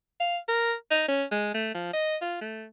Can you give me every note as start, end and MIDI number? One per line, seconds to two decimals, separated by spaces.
0.20 0.37 77
0.49 0.74 70
0.91 1.06 63
1.08 1.24 61
1.31 1.53 56
1.54 1.70 57
1.75 1.91 53
1.93 2.16 75
2.22 2.39 65
2.42 2.66 57